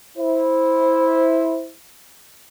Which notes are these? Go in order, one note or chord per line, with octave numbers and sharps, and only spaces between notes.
E4 C5